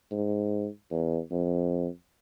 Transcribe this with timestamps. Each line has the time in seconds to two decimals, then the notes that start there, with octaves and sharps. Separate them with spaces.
0.11 G#2
0.91 E2
1.32 F2